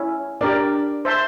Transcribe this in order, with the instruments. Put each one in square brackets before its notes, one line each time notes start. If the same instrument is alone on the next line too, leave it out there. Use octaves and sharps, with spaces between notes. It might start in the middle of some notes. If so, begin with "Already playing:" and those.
Already playing: [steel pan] C#4 E4
[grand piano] D4 [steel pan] G4 A#4 D5
[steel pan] C5 E5 A5 C6